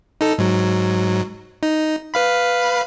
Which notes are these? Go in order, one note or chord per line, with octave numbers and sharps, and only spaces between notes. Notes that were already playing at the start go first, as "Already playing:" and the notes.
D#4 A4
G#2 F#3
D#4
B4 F5 B5